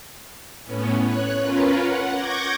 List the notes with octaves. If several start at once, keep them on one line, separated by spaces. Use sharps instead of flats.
A2 B3 C#4
C#5 F#6
C#4 F4 A#4 B4
F#5
C#6 D6 G6 G#6 A#6